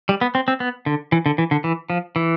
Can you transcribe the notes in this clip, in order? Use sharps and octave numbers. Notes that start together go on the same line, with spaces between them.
G3
B3
C4
C4
B3
D3
E3
D3
E3
D3
E3
F3
E3